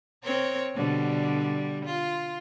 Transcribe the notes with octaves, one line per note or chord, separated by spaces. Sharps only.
C4 A#4 C#5
B2 D3 G3
F4